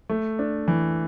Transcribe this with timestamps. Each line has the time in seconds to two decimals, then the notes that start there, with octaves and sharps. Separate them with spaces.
0.10 A3
0.39 D4
0.68 E3